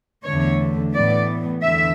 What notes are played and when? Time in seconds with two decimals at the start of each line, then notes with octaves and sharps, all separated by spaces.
0.25 E2 D3 A3 C#5
0.93 A2 E3 B3 D5
1.62 E2 D3 E5